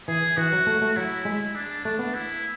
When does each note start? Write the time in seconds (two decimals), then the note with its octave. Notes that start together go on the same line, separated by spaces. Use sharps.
0.08 E3 G#4
0.37 E3 F#4
0.53 F#3
0.67 A3
0.82 A3
0.96 F#3 E4
1.25 G#3
1.55 D4
1.85 A3 D4
1.99 B3
2.14 E4